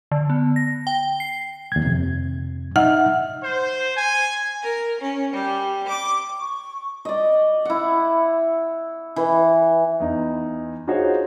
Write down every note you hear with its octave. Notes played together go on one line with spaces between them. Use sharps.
D3
B3
A#6
G5
C7
D#2 G#6
F2 C3
D#4 E5 F#5 F6
C5
G#5
A#4
C#4
G3
D6
C#6
D5 D#5
E4 F#5
E3
E2 D#4
D#4 F4 F#4 G#4 C5 C#5